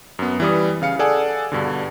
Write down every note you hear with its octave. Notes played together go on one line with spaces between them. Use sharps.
F#2 B3
E3 G3 D#6
C#3 F5 C#7
G#4 A4 D5 F#5 G#5
G2 B2 D3